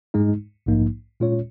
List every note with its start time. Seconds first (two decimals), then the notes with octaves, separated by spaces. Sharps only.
0.14 G#2 G#3 D#4
0.66 A#1 G#2 F3 A#3 D#4
1.20 A#2 G#3 C#4 F4 C#5